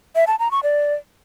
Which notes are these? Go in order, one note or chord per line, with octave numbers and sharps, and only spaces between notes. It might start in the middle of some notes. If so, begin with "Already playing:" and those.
E5
A5
A#5
C#6
D5